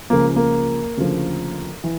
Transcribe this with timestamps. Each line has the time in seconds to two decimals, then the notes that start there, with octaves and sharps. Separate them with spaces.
0.10 C#2 C#3 F3 A#3
0.36 A#3
0.97 D2 C#3 F3
1.84 E3